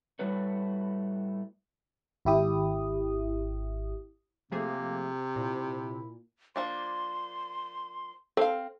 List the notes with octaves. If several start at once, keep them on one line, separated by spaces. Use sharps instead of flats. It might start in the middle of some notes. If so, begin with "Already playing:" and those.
A2 G3 A3 F#4 B4 C#5
G#1 E4 G4 D#6
C3 F3 A3 A#3 G#4
A#2 E4
F3 A#3 D4 C6
C4 A4 F5